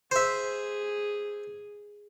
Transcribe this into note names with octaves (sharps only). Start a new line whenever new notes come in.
G#4 C5 E5